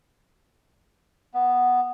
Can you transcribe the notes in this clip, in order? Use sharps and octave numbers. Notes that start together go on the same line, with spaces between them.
B3